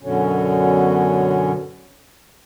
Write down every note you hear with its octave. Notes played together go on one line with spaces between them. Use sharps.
F#2 B2 D3 C#4